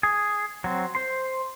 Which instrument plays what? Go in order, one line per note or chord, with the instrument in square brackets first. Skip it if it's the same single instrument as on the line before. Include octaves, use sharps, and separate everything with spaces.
[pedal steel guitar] G#4
F#3 C4
C5 C6